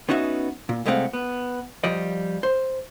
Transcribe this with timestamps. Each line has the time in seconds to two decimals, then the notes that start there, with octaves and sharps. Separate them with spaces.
0.09 B3 C#4 D#4 F#4 E5
0.69 A#2
0.86 C2 G#3 A3 C4 F5 F#5
1.13 B3
1.84 F3 G3 D5 D#5
2.43 C5